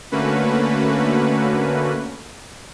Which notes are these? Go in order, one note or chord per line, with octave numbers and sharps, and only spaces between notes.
D3 A3 A#3 C#4 F#4 B4